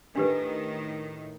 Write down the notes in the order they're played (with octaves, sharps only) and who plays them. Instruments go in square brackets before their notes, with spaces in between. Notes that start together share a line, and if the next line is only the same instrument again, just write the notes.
[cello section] A2 D#3 [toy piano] D4 G4 B4